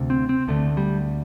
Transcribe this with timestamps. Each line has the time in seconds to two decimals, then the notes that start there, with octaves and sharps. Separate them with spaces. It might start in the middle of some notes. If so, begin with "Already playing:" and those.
Already playing: D2 C3
0.10 C4
0.29 C4
0.48 D2 D3 A3
0.77 G3